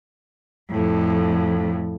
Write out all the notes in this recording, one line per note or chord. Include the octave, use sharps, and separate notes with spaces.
F2 A2